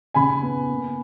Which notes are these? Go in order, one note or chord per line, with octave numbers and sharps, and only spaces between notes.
C#3 G#5 B5
B3
A#3